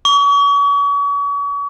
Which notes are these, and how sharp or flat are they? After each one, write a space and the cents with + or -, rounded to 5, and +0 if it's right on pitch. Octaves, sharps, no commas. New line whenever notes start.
C#6 +40